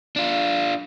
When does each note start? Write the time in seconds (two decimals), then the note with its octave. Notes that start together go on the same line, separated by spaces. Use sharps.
0.16 D4 F4